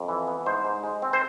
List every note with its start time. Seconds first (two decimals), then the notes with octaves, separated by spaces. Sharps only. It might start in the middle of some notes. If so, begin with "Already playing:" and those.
Already playing: F2
0.08 E3
0.27 B3
0.46 G#2 C5
0.65 G#2
0.83 G#3
1.02 C4
1.13 C5